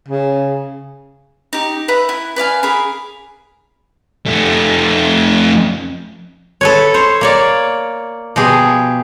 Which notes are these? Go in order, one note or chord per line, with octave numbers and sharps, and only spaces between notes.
C#3
D#4 G4
B4 E5 F#5 B5
E4
B4 D5 F5 G#5
G#4 A#4 F5 B5
F2 A3
A4 B4 C#5
C5 C#5
A#3 C#5 D5
B2 F3 G4 G#4